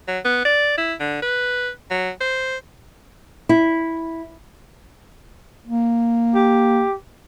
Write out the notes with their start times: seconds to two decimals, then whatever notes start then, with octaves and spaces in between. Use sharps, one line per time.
0.08 F#3
0.25 B3
0.45 D5
0.78 E4
1.00 D3
1.22 B4
1.91 F#3
2.21 C5
3.49 E4
5.67 A#3
6.35 G4